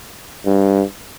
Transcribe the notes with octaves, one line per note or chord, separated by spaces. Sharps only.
G2